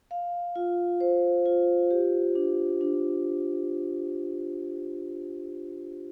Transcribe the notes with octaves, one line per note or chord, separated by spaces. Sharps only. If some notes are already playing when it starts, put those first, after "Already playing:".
F5
F4
C5
F4
G4
D4
D4